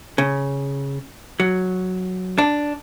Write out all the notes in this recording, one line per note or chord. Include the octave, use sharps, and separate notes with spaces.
C#3
F#3
D4